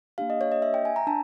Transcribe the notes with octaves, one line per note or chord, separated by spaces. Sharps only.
A#3 D4 G4 F5
D#5
C#5
D#5
E5
G5
G#5
A#5
D4 A5